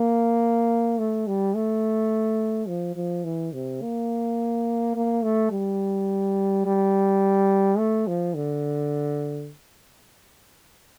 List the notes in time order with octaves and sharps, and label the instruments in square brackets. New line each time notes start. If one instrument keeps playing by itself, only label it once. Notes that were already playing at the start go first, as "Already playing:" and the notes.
Already playing: [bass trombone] A#3
A3
G3
A3
F3
F3
E3
C3
A#3
A#3
A3
G3
G3
A3
F3
D3